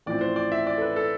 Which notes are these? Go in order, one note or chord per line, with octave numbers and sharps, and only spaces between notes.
A1 A2 F3 C4 D5
C5
D5
E5
D5
A4
B4
A4